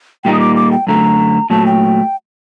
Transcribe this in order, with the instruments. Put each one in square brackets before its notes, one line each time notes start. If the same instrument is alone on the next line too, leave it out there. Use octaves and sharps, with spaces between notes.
[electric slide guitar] A#2 G3 A#3 D#4 [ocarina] G5
[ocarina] D#6
D6
D6
G5
[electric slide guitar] F#2 D3 A3 [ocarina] A#5
[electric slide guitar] A#2 F#3 A3 [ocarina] A5
[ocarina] G5